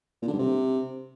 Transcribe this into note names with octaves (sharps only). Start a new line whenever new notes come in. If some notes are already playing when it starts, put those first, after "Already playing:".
A#2
D3
G2
C3